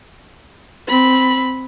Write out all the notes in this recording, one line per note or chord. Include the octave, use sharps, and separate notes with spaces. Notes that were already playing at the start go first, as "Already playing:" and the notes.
C4 B5